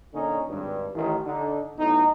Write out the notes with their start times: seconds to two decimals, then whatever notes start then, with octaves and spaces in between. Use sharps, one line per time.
0.14 A#2 D3 C#4 D#4
0.47 G#1 G2
0.94 A1 D#3
1.25 D3 D#4
1.77 B1 A2 D#4